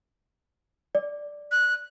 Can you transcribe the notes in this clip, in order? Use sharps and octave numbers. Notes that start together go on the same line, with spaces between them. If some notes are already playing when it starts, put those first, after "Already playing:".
D5
F#6